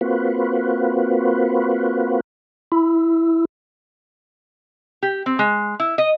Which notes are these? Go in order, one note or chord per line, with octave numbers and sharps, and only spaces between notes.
A#3 C4 F4 F#4 B4
E4
G4
C4
G#3
E4
D#5